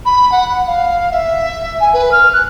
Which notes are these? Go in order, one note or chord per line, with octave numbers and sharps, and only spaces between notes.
B5
F#5
F5
E5
G#5
B4
F6
F#6